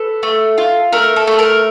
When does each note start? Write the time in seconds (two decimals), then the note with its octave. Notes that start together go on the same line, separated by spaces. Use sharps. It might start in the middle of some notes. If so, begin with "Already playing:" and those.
Already playing: A4 B4
0.23 A3
0.58 F4
0.92 A3 A#4
1.16 A4
1.27 A3
1.39 A#4